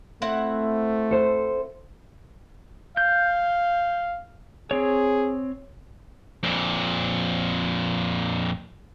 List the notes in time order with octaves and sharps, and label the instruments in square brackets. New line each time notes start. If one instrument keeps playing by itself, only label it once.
[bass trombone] A3 [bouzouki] C4 E4 F#5
[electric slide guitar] A4 C5
[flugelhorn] F5 [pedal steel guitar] G6
[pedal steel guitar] C4 C#5 [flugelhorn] G#4
[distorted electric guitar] F2 A#2